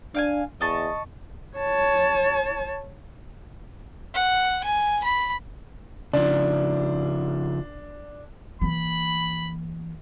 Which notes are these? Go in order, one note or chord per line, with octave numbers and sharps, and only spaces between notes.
D4 F5 G5 G#5
E2 D#5 A5 C#6
C#5 A5
F#5
G#5
B5
C#3 F3 D4
E3 A#3 B5